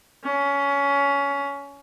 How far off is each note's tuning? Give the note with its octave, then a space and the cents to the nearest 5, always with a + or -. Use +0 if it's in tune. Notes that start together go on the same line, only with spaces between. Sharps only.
C#4 +20